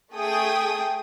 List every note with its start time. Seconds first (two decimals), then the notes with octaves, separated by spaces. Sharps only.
0.13 A3 G#4 G5 D#6